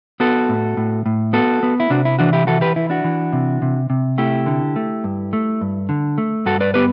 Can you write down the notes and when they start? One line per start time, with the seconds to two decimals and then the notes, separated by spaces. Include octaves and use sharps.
0.20 B3 F#4 A4
0.49 A2
0.77 A2
1.06 A2
1.33 B3 F#4 A4
1.63 B3
1.80 E4
1.90 C3 D4 F#4
2.05 E4
2.19 E3 D4 F#4
2.33 E4 G4
2.47 E3 F#4 A4
2.61 G4 B4
2.76 E3 E4
2.90 D4 F#4
3.04 E3
3.33 C3
3.62 C3
3.90 C3
4.18 A3 E4 G4
4.46 D3
4.76 A3
5.04 G2
5.33 A3
5.61 G2
5.89 D3
6.18 A3
6.46 G2 F#4 A4
6.60 B4 D5
6.74 B3 G4 B4